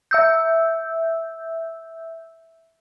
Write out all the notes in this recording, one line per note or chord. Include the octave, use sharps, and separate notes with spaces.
E5 E6 G6